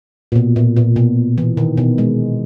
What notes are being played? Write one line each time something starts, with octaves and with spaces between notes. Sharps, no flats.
A#2
B2
A#2
A#2
B2
E3
D#3
B2
G#3